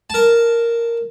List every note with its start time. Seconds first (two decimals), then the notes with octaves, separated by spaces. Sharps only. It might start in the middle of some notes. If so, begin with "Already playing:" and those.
0.10 A#4 A5